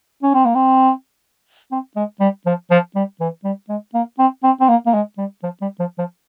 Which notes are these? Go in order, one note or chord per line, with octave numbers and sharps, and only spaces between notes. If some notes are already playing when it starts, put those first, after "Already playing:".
C#4
C4
A#3
C4
C4
G#3
G3
F3
F3
G3
E3
G3
G#3
A#3
C4
C4
C4
A#3
A#3
G#3
G3
F3
G3
F3
F3